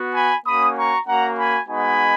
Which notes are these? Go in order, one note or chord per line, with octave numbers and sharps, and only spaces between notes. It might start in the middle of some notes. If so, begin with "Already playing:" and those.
Already playing: B3 F#4
G#5 B5
A#3 C#4 F#4 B5 D#6
A#5 C#6
A#3 C#4 F#4 F#5 A#5
G#5 B5
G#3 B3 D#4 F#4 G#5 B5